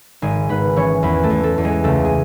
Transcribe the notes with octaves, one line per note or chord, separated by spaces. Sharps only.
G#1 G#3 G#4
G#1 B3 B4
E3 C#4 C#5
E2 B3 B4
A3 A4
E2
A3 A4
E2
G#3 G#4
C#2 A3 A4
G#4